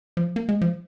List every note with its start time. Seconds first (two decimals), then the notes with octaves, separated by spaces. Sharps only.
0.17 F3
0.36 A#3
0.49 G#3
0.61 F3